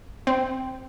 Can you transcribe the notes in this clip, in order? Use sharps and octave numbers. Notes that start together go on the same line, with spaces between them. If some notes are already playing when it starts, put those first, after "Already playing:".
C4